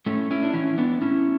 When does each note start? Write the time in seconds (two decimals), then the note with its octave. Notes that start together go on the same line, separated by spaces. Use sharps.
0.06 A2 A3 C#4
0.31 C#4 E4
0.43 D4
0.54 E3 C#4 E4
0.78 B3 D4
1.01 A2 C#4 E4